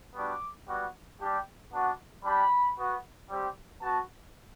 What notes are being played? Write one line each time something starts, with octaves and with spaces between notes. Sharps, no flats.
G3 B3 D4 F#4 D6
G3 B3 F#4
G3 D4 G4
B3 D4 F#4
G3 D4 G4 B5
B3 F#4
G3 C4 G4
B3 F#4 A5